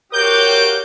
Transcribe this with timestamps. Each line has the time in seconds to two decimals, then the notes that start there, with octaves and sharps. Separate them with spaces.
0.13 F#4 G4 A#4 C#5 F5 D6 G6